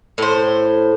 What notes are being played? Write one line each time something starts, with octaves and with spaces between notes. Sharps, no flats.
A2 C5